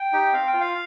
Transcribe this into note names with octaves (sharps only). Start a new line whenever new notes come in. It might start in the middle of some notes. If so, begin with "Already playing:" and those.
Already playing: G5
D#4 G4
C4 F5
G5
F4
F5